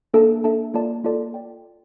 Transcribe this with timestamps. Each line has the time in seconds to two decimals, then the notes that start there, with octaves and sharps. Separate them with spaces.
0.14 A#3 D4 A4 E5 A5
0.44 A#3 D4 A4 E5 A5
0.74 A#3 F4 A4 D5 A5
1.04 A#3 F4 A4 D5 A5
1.34 D5 G5